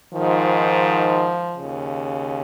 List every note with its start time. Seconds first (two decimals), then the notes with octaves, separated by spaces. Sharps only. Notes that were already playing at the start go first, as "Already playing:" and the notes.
0.12 G#2 D#3 F3
1.58 D#2 C#3